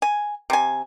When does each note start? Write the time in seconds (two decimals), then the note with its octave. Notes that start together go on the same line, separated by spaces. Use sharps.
0.02 G#5
0.50 C3 G#5